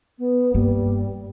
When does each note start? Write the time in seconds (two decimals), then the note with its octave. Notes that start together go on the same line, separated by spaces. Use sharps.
0.18 B3
0.54 G2 G3 A#3